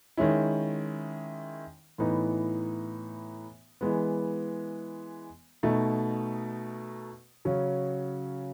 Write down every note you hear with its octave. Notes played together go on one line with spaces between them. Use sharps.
D#3 G#3 C#4 E4
A2 E3 B3 D#4
E3 G#3 B3
B2 A3 D#4
C#3 F#3 C#4